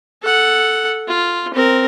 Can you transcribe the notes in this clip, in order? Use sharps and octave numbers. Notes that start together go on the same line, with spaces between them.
A4 F#5
F4
C4 A#4